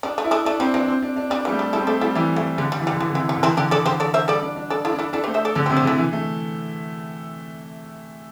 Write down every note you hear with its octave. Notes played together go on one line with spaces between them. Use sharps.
G3 D4
A3
E4
A3 D4
A3 D4
G3 C4
E3 D4
C4
D4
D4
G3 D4
E3 G3
A3
G3
G3 E4 A4
C4
A3 A4 D5
G3 E4 A4
E3 D4 G4
E3 A3
D3 G3
G3
E3
G3
D3
E3 G3
D3
C3 E3
G3
D3
E3 C4 E4
D3 D4 G4
D3 A4 D5
D3 G4 C5
A4 D5
C5 E5
G3 A4 D5
D4
D4
D4 A4 D5
E4 A4
D4
E4 A4
D4 E4 A4
G4 C5
A3
C5 E5
A4 D5
D3 A4 D5
G4 C5
C3
G4 C5
D3
E4 A4
E3
A3